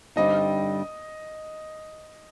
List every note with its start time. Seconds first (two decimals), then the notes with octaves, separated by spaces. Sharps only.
0.16 G2 D3 G3 C4 D#4 D#5